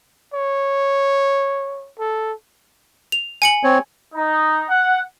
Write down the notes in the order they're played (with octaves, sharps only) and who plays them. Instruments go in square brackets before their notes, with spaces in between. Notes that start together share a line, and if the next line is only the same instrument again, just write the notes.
[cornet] C#5
A4
[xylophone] F7
G#5 C#7 F#7
[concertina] C4 C#5
[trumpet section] D#4
F#5